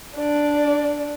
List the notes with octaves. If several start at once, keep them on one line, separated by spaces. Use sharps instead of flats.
D4 D5